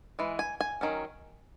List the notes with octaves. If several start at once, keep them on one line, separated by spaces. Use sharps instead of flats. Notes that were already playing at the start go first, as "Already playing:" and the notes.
E3 G#3
G#5
G#5
D#3 F#3 C#4